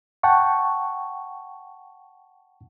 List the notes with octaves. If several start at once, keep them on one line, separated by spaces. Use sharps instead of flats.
F#5 G5 A5 C#6